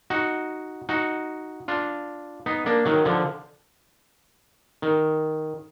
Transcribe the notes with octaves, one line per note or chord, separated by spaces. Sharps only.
D#4 F#4
D#4 F#4
D4 F4
B3 D#4
A#3 D4
D#3 F#3
D3 F3
D#3